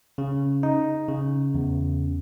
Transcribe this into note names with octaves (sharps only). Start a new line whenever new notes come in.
C#3
D#4
C#3
E2